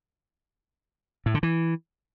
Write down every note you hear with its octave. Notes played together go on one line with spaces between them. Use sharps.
A2
D3
E3